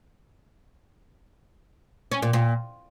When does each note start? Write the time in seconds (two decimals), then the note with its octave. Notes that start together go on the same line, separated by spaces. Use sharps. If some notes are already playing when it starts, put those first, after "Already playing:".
2.12 C#4
2.22 A#2
2.33 A#2